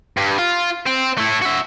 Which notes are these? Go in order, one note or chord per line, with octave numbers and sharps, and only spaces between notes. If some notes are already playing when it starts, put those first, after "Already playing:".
G2
F4
C4
A3 E4
F#4 E5